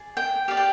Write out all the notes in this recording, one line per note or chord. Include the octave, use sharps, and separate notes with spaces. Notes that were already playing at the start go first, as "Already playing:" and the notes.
Already playing: G#4 D5
G5
G4 D5 F5
G5